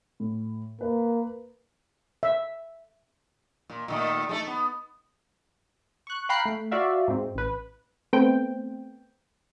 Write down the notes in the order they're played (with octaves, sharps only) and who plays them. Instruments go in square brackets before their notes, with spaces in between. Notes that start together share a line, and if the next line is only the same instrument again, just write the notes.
[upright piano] A2
[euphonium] A#3 [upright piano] B4
[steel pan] E5
[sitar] A#2
A#2 D#3 A3
G#3 A3 A4
B3
[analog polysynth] C#6 F#6
F5 G5 A#5 B5 F#6 C7
A3
F4 F#4 D5 E5 F5
G#2 C4
A1 B4
[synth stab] A3 B3 C4 G5